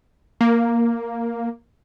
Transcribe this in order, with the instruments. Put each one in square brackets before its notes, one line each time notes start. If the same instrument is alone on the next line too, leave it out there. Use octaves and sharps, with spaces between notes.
[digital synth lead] A#3